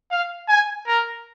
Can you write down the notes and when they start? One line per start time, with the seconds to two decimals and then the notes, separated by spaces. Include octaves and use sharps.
0.11 F5
0.49 G#5
0.87 A#4